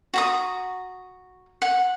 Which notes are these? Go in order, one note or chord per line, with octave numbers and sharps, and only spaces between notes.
F#4 A#5 D#6
F#5